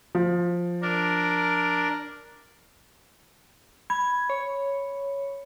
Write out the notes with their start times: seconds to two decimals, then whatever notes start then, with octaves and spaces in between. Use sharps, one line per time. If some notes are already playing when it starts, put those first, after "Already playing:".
0.15 F3
0.82 D4 A#4
3.90 B5 G#6
4.30 C#5